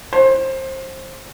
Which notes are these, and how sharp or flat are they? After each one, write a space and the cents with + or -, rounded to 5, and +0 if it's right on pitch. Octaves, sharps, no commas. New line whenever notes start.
C5 +20